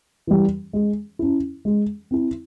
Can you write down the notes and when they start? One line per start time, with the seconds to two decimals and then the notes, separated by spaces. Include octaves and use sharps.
0.27 E3 G3
0.73 G#3
1.19 C#4 E4
1.65 G#3
2.11 C4 E4